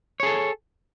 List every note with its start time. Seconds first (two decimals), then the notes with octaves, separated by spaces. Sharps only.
0.20 C#5
0.23 G#4
0.26 A4